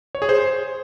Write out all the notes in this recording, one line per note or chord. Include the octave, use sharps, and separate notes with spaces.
C#5
G#4
C5